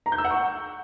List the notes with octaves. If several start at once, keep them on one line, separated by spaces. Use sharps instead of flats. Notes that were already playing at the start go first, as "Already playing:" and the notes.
A#5
G6
E6
F#5
C#6